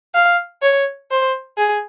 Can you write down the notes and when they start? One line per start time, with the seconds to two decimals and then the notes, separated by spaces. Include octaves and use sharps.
0.15 F5
0.62 C#5
1.11 C5
1.58 G#4